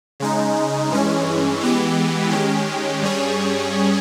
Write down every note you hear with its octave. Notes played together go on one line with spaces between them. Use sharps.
C#3 G#3 D#4
G2 E3 G#3 C#4
E3 G#3 B3 G4
D#3 G#3 C#4 G4
G2 G3 C#4 G#4 C#5